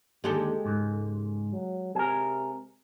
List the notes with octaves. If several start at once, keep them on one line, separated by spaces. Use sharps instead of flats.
D#2 D3 G#3 G4 A4
C#2 G#2
F#3
C3 G#4 A#4